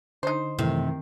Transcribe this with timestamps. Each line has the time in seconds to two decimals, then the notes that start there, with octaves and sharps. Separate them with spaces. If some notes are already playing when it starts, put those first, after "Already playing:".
0.23 D3 D#4 C5
0.59 F#2 C3 D#3 E3 A3